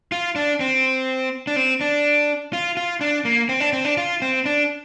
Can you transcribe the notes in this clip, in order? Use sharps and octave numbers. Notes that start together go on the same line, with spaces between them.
F4
D4
C4
D4
C4
D4
F4
F4
D4
A#3
C4
D4
C4
D4
F4
C4
D4